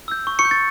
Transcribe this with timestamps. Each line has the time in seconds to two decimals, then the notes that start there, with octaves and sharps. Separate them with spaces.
0.08 E6 G6
0.27 C#6
0.39 C#6 C#7
0.45 G6
0.51 A6